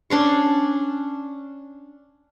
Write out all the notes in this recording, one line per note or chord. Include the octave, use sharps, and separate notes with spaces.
C#4 D4 C6 C#6